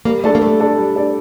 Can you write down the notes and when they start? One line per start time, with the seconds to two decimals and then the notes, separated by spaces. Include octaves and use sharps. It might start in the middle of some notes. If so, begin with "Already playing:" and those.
0.05 G3 A#3
0.24 A3 D4 A4 D5
0.35 A#3
0.42 G3 A3
0.60 D4 A4 D5
0.78 G3
0.96 D4 A4 D5